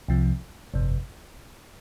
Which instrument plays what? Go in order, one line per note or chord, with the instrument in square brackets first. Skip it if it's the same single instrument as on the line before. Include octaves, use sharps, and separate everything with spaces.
[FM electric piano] C2 C3 F3
G1 F2 C3